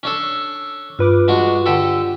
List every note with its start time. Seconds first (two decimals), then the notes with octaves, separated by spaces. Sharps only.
0.03 C#4 D4 A4
0.99 G2 F4 B4 D6
1.28 G#3 D4 F#4
1.66 D3 G4 A4